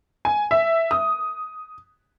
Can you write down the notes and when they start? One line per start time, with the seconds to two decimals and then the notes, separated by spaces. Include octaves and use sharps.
0.25 G#5
0.51 E5
0.91 D#6